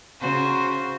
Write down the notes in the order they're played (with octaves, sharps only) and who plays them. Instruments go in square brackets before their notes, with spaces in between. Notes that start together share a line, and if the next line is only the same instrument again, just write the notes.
[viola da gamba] C#3 F#4 C5